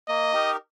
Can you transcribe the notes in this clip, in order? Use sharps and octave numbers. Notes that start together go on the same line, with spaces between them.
A#3 D#5
D#4 G4 A#4